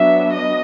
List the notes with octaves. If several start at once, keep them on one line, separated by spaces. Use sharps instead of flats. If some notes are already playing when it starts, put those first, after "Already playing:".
Already playing: F#3 B3 D4 E5
D#5